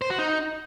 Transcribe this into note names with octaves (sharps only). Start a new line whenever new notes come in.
C5
F#4
D#4